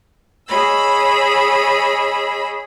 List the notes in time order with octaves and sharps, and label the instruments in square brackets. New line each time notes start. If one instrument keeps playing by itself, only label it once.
[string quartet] G#4 C#5 D#5 B5 E6